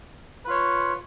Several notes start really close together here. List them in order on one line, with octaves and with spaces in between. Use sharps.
B4 F4 C#5